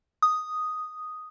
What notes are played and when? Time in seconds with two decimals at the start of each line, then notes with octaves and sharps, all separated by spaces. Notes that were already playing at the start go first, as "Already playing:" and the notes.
0.22 D#6